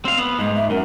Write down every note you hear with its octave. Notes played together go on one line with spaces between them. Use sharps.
C4 F5
B3
G#2 G#3
E5
F#2 A#4